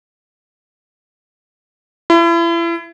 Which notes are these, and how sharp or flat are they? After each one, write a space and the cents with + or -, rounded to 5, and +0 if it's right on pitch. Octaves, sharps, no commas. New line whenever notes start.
E4 +35